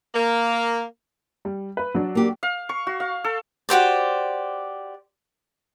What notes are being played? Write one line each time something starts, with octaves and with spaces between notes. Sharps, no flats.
A#3
G3
B4
F#3 D4
A#3 G4
F5
C#6
F#4
F5
A4
F#4 G4 C5 D5